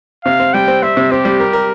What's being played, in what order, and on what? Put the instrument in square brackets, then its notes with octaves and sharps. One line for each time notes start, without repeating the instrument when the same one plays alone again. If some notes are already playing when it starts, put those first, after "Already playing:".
[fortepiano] C3 [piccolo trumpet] F5
[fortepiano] C4
[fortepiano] G3 [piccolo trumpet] G5
[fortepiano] C4
[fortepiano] C4 [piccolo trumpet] E5
[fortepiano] C3
[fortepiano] C4 [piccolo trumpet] G4
[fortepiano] G3
A#4
A#4